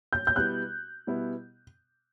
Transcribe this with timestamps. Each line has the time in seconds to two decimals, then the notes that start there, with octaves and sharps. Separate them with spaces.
0.13 G6
0.27 G6
0.36 B2 G3 B3 E4 F#6
1.07 B2 G3 B3 E4